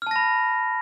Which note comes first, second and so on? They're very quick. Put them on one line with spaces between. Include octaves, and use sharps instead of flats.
F6 A5 A#6 B5